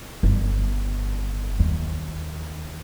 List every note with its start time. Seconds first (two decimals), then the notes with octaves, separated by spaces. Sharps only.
0.23 G1
1.59 D#2